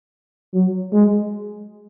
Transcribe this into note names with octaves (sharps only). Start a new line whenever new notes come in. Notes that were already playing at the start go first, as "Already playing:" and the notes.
F#3
G#3